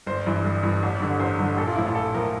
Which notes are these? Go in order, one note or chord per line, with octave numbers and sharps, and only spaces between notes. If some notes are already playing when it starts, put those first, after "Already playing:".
G1 C5
G2 E3
G1
G2 E3
A1
G2 D3 G3
A1 C5
G2 D3 G3
A#1 A4
F4
A2 F3 E4
F4
A#1 A4
A2 F3 A#4